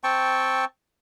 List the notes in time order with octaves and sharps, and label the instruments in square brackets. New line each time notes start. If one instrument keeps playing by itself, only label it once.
[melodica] C4 G5 A5 C#6